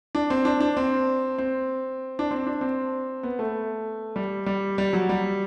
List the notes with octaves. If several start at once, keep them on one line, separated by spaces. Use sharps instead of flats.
D4
C4
D4
D4
C4
C4
D4
C4
D4
C4
B3
A3
G3
G3
G3
F#3
G3